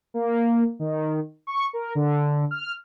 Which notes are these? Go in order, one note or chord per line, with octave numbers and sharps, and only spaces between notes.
A#3
D#3
C#6
A#4
D3
F6